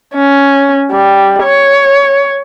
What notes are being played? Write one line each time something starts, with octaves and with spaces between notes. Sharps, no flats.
C#4
G3
C#5